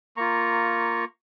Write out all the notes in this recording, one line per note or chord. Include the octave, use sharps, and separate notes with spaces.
A#3 F4 A#5 C#6